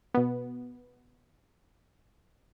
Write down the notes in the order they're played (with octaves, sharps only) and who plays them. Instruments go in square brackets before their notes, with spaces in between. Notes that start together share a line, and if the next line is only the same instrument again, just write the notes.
[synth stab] B2 B3